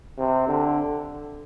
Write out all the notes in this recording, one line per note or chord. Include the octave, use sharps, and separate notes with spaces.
C3
D3